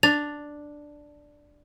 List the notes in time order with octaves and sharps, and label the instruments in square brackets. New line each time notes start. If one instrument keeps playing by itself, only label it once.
[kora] D4 [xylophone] A6 F7